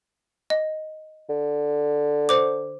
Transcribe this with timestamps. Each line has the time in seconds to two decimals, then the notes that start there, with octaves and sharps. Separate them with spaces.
0.50 D#5
1.29 D3
2.29 C5 D6